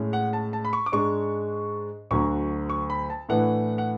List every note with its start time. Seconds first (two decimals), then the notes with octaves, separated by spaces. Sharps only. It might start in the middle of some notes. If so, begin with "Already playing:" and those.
Already playing: A2 G#3 C#4
0.13 F#5
0.33 A5
0.53 A5
0.65 B5
0.73 C#6
0.86 D6
0.92 G#2 G#3 D4 C#6
2.11 D2 D3 F#3 C#6
2.70 C#6
2.90 B5
3.10 A5
3.29 A2 E3 A3 D4 F#5
3.78 F#5